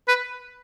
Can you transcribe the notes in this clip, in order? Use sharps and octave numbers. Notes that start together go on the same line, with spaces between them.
B4